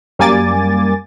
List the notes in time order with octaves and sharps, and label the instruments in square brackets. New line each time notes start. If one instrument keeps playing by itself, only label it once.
[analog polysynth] F#2 G3 A#3 G#5 D6 A6